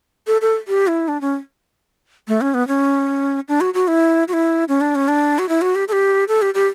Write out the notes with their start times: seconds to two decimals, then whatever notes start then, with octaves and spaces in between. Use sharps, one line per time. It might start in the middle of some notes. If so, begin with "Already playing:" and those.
0.27 A4
0.41 A4
0.68 G4
0.87 E4
1.08 D4
1.21 C#4
2.28 A3
2.41 C#4
2.54 B3
2.68 C#4
3.48 D4
3.61 F#4
3.74 F#4
3.88 E4
4.28 F#4
4.33 E4
4.69 C#4
4.81 D4
4.95 C#4
5.08 D4
5.39 F#4
5.49 E4
5.62 F#4
5.75 G4
5.88 A4
5.92 G4
6.28 A4
6.42 G4
6.54 G4